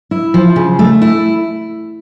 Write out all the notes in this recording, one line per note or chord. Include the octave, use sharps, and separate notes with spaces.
E4
F3
C#3
A3
E4